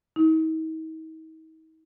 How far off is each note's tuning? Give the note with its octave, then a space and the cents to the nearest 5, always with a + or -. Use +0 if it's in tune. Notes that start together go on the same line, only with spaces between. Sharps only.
D#4 +45